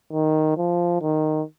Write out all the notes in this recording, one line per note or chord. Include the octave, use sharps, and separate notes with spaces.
D#3
F3
D#3